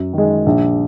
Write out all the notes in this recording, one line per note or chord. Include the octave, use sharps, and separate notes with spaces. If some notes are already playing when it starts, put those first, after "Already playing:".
Already playing: F#2
D#3 G#3
A#1